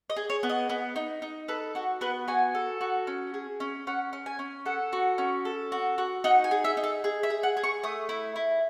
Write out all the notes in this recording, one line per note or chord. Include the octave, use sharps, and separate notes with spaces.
D#5
G#4
C#5
B3
D#5
B3
D#4
D#4
A4 B4
F#4 A4
B3 B4
F#4 G#5
A4
F#4
C#4
G#4
C#4
C#4 F#5
C#4
G#5
C#4
A4 F#5
F#4
C#4
A4
F#4
F#4
D#4 F#5
G#5
G#4
E5
D#4
A4
G#4
E5
G#4
F#5
G#4
C#6
A3 D#6
E4
E4